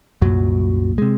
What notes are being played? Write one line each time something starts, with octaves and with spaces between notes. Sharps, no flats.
C2 F#2 A#2 F#3
C3 G#3